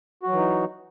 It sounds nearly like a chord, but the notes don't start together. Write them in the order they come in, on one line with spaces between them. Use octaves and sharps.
F#4 F#3 E3 D#4